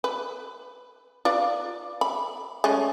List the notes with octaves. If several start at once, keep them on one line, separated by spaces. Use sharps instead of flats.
B4
F4 B4 D5
B5
G#3 A3 C#4